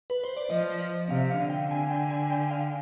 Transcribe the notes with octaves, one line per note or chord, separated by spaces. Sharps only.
B4
C5
D5
F3 D#5
C3 F5
F5
D3
G5
G#5
G5
G#5
G5
F5